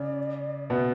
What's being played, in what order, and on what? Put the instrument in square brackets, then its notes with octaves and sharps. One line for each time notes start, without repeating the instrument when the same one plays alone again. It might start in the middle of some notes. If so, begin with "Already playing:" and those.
Already playing: [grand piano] C#3 [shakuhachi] D5
[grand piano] B2 B3 [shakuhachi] E5